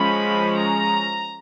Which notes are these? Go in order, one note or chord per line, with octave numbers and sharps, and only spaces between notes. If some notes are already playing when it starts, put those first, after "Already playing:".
Already playing: F3 G#3 C#4 B5
A#5